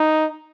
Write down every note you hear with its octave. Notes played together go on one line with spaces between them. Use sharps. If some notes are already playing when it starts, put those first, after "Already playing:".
Already playing: D#4